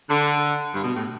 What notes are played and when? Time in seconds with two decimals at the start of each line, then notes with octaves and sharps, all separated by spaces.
0.09 D3
0.74 G2
0.83 B2
0.95 A2